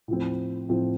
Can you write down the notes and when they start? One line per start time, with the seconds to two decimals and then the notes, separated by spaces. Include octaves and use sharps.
0.08 A2 F3 C4
0.69 A2 F3 C4